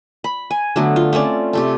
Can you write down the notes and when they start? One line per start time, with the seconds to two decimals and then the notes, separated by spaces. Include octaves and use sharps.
0.24 B5
0.51 G#5
0.76 D3 F#3 A3 B3
0.96 F4
1.13 A3 C4 C#4 D5
1.53 C3 A3 A4